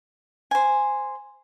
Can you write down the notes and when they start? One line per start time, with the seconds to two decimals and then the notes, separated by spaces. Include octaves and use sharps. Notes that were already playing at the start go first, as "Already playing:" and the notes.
0.51 C5 G#5